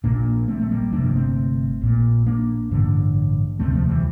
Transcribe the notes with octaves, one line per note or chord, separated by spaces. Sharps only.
A#1 A#2 A#3 D4
A3 C4
A3
G3 A#3
G1 F2 C3 A#3 D4
A3 C4
A#1 A#2
A#3 D4
A1 G2 D3
E1 D2 C3 A3 C4
F3 A3
E3 G3